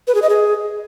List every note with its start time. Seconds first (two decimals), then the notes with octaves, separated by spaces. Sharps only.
0.07 B4
0.14 G#4
0.22 D#5
0.29 G#4